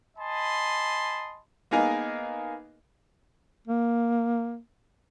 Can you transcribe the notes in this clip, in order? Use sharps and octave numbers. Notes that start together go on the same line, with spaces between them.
D#5 G#5 A5 B5 C6
A#3 B3 D#4 G#4 A#4
A#3